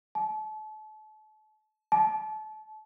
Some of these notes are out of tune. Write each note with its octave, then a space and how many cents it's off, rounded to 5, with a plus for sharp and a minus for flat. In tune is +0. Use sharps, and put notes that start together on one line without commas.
A5 -35
A5 -30